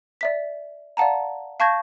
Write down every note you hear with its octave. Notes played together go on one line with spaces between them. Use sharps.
D5 E5 B6
D5 F5 F#5 A5 A#5
F5 A5 C#6 G6 G#6 A#6